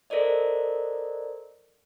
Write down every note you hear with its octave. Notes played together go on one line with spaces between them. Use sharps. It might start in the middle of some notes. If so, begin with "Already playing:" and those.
A4 A#4 C5 D5 D#5